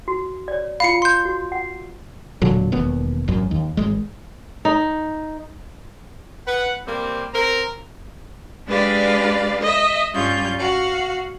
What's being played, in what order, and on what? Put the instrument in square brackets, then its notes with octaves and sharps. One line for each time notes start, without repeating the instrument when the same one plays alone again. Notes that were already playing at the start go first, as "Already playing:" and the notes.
[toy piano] F#4
C#5 D5
[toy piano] F4 B5 [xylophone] F5 C7 C#7
[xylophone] C6 G6
[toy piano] F#4
F#5
[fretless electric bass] E1 A#2 D3 F#3
E1 D#2 B3
G#1 F#2
D#2
G#1 G#3
[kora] D#4
[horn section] B4 F#5
G3 A#3 C4
C4 A#4 A#5
[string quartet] G#3 D4 G4 B4 D5 F5
D#5 E5
G2 G3 C#4 F4 G6
F#4 F5